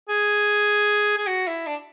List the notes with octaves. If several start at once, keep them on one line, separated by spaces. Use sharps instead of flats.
G#4
G#4
F#4
E4
D4